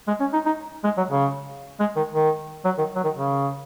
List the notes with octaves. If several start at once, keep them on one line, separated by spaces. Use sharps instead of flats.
G#3
C#4
D#4
D#4
G#3
F#3
C#3
G#3
D#3
D#3
F#3
D#3
F#3
D#3
C#3